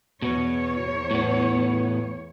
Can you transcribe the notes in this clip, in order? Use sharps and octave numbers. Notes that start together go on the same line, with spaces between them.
E2 B2 B3 C#5
A2 B3